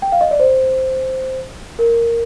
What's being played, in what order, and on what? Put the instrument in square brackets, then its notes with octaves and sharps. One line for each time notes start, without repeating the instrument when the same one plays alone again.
[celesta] G5
F5
D#5
D5
C5
A#4